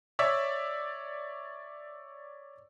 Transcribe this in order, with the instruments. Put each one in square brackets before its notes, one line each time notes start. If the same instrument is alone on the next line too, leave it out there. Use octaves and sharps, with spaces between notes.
[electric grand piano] C#5 D5 E5 E6 B6